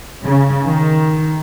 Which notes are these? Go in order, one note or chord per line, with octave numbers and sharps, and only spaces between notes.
C#3
D#3